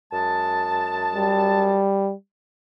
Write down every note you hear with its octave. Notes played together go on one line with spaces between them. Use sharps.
F#2 G#3 A5
G3